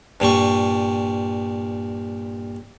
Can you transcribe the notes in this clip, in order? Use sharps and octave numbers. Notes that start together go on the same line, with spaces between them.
G2 A#2 G3 C#6